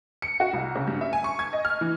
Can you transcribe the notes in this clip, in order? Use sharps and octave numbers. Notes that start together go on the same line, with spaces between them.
C#7
F#4
C2
C#3
G2
E5
G#5
C#6
G#6
D#5
F6
E3